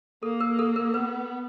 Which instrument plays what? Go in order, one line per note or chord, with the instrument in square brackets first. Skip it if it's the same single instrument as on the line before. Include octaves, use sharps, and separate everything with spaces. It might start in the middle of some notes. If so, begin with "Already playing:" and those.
[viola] A#3 [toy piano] A4
[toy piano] A#4
A4
A#4
[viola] B3 [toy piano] B4